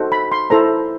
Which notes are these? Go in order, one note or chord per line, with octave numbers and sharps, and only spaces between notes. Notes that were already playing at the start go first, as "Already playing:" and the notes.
Already playing: D#4 F#4 A4 C5
B5
C6
E4 A4 C5 A#5